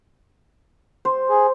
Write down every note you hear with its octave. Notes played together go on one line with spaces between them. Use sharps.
C5
G#4